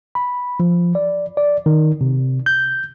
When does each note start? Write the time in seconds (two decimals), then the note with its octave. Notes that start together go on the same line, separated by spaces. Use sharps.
0.15 B5
0.60 F3
0.95 D5
1.37 D5
1.66 D#3
2.01 C3
2.46 G6